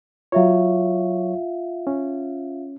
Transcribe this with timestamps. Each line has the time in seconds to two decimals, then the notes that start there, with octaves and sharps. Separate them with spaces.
0.32 F#3 F4 C#5 E5 F5
1.87 C#4